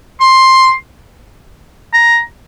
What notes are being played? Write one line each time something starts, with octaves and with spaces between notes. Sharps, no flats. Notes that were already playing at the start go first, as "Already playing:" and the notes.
C6
A#5